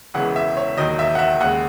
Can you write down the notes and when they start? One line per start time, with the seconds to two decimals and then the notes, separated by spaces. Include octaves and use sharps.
0.14 E1 E2 C#3 E3 G#3 F#5
0.36 E5
0.57 C#5
0.77 E1 D#2 D#3 F#3 D#5
0.99 E5
1.15 F#5
1.19 E5
1.40 D#2 C#3 G#3 F#5